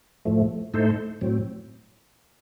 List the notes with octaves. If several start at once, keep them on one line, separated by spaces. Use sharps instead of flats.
A2 F3 A3
A2 A3 D#4 A4 C5
A2 F#3 C4